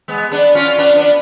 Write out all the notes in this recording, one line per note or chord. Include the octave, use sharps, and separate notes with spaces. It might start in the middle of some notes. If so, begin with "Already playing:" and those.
G#3 B3
B3 D4
C#4 F4
B3 D4
B3 D4